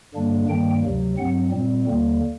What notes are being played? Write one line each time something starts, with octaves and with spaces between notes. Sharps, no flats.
G2 D3 G3 A#3 D4
G2 D#3 G3 A#3 G5
D2 C3 F#3
G2 F#3 C4 F#5
A#2 G3 C4
D#2 D3 G3 A#3